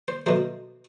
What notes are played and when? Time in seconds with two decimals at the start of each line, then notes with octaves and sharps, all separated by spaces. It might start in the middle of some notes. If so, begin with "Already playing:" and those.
0.08 C5
0.26 B2 F#3 A3 C5